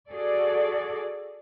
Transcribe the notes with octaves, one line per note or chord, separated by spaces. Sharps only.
F#4 G#4 A4 D5